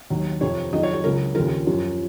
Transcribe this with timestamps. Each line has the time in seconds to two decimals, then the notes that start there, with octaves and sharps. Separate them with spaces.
0.10 D#2 D#3 F#3
0.41 F2 C3 F3 C#5
0.73 F2 D#3 F#3 D#5
0.83 C#5
0.93 C#5
1.04 C#2 C#3 F#3 A#4
1.35 D#2 C#3 F3 A#4
1.67 F#2 F3